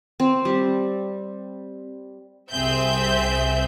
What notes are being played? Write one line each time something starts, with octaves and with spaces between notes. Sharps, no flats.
C4
G3
C2 C4 G#4 E5 G6